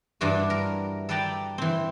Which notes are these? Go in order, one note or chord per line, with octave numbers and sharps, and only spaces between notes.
G2 E3 D4 E4 F#4
A#4
A4 B4 D5 G5 A5 A#5
E3 C4